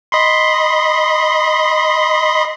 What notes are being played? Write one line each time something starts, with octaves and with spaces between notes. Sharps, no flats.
D#5 B5 C6